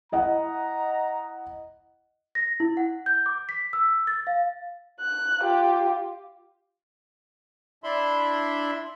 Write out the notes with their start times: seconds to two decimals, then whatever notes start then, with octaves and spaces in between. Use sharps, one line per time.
0.12 E4 D#5 F#5 A#5
2.35 A#6
2.60 E4
2.77 F#5
3.06 G6
3.26 D6
3.49 B6
3.73 E6
4.07 A6
4.27 F5
5.00 F#6
5.40 F4 G4
7.84 D4 E4 E5 B5 C6